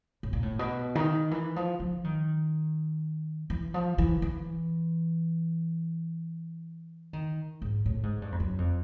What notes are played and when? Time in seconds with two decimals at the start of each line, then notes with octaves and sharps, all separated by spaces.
0.23 A2
0.33 A#2
0.43 A2
0.59 B2
0.95 D#3
1.31 E3
1.56 F3
1.80 F3
2.04 D#3
3.50 E3
3.74 F3
3.98 E3
4.22 E3
7.13 D#3
7.62 G#2
7.86 A2
8.03 G#2
8.22 G2
8.32 F2
8.40 F#2
8.58 F2